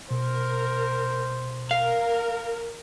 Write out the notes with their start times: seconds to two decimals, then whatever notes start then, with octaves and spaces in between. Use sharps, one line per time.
0.11 B2 A#4 C5
1.71 A#4 F5